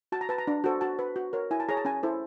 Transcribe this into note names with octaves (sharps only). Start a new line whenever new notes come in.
F#4 A5
A#5
B4 A5
A#5
D4
F#4 A4 C5
F#4 A5
B4
F#4
A#4 C#5
E4 G#5
A5
G#4 C#5 A#5
A5
C#4 G#5
E4 A4 C5